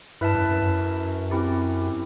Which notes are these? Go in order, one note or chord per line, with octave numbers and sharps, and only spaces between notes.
G2 E4 B4 E5 A5
F#2
F#2
F#2
C4 E4 G4